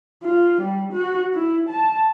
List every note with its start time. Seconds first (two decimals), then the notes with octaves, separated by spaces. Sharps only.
0.23 F4
0.62 G3
0.93 F#4
1.34 E4
1.69 A5